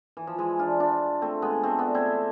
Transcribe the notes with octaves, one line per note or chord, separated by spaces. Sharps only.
E3
F3
E3 G#3
D4 F4
D4 F4
A3 C4
G#3 B3
A3 C4
B3 D4
C4 E4